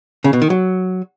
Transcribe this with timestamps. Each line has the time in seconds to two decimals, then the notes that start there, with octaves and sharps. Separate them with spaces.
0.24 C#3
0.33 B2
0.42 D#3
0.50 F#3